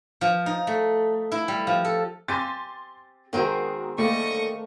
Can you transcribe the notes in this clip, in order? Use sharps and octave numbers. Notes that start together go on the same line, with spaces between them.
F3
D#4
A3
E4
G3
F3
A4
C4 G4 G#5 C6 A6
D#3 G#3 B3 C4 F#4 G#4 A#4 C5
D3 G3 A3 A#3 D5 D#5 C#6